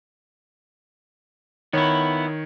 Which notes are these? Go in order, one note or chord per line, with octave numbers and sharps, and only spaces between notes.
D#3 B3 E4 C#5